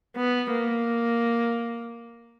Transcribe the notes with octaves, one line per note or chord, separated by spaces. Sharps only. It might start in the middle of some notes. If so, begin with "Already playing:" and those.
B3
A#3